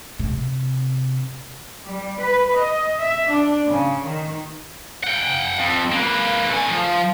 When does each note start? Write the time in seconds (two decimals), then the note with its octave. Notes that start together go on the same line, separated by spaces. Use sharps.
0.19 C3
1.84 G3
2.20 B4
2.56 D#5
3.00 E5
3.30 D4
3.67 C#3
4.06 D#3
5.03 F#5 G5
5.58 F2
5.92 A#3 B4
6.50 A3 G#5
6.71 F3